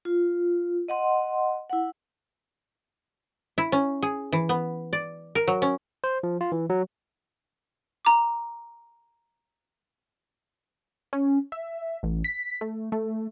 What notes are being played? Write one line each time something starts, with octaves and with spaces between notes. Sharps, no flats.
F4
D#5 F#5 C6
E4 F#5
E4
C#4
G#4
E3
B3
D5
A#4
F#3
C#4
C5
F3
F4
E3
F#3
A#5 D6
C#4
E5
A1
B6
A3
A3